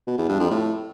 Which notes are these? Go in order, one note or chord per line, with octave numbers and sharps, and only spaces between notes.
B2
E2
G2
F2
A2